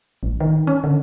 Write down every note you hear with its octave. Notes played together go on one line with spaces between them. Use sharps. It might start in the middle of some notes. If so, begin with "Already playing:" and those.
A1
D#3
C#4
D3